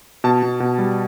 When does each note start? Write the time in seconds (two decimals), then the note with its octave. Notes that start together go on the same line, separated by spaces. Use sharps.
0.24 B2 A5
0.43 B2
0.60 B2
0.78 G3